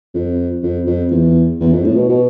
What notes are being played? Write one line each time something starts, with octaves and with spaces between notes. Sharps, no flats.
F2
F2
F2
E2
E2
F2
A2
B2
B2